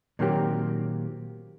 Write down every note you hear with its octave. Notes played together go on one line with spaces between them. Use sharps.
A#2 D#3 F#3 A#3 C4 G4